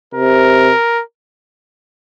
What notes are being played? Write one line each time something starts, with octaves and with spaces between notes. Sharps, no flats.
C3 A#4